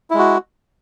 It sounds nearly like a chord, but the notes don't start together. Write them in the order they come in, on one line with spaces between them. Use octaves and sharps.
E4 G#3 F#4